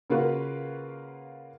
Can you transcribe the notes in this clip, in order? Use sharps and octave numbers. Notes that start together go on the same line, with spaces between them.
C#3 A#3 F4 F#4 B4